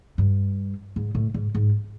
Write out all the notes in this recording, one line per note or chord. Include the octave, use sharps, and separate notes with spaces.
G2
G#2
A2
G#2
G#2